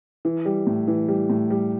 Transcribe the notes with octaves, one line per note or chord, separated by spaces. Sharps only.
E3
G3
A2
E3
G3
A2
G3